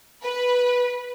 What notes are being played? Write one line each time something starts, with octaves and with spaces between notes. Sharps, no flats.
B4